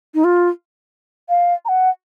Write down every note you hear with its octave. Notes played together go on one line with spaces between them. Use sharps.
D#4
F4
F5
A#5
F#5